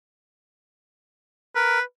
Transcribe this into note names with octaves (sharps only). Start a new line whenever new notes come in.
A#4 B4